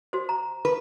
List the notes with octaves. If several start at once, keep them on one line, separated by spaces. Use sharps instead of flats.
F#4 C5
A#5
B4